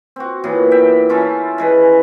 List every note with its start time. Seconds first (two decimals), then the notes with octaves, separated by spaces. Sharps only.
0.16 C4 F#4
0.44 A#2 E3 F#3 B3
0.71 E5 G5
1.09 C#4 E4 F4 A4
1.58 E3 G#3 B4